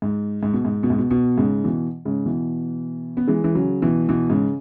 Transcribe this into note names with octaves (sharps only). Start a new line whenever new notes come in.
G#2
G#2
B2
G#2
B2
G#2
B2
B2
G#2 C#3
B2 E3
G#2 C#3
B2 E3
B3
E3 G#3
E3
C#3 F#3
B2 E3
B2 E3
G#2 C#3